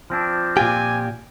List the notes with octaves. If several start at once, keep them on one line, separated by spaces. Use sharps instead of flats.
F3 C4 D4
A#2 F4 G4 G#5